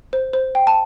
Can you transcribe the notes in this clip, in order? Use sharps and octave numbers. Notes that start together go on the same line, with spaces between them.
C5
C5
G5
A5